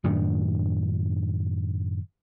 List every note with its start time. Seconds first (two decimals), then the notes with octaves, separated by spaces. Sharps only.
0.04 F#2 A2 D#3 D4